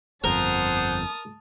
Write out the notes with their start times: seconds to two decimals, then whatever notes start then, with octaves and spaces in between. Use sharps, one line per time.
0.24 G1 F2 A#4 C5 F#5 A5 D#6